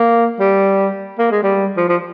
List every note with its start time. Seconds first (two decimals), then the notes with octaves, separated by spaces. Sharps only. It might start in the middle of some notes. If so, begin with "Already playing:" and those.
Already playing: A#3
0.40 G3
1.19 A#3
1.31 G#3
1.43 G3
1.77 F3
1.89 F3